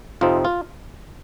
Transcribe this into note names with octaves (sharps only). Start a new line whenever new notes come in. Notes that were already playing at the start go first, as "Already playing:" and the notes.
F2 C3 F3 C4 D#4 F4
F4